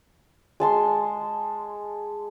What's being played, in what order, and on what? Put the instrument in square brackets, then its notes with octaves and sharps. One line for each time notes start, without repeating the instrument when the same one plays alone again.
[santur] G#3 A5 C6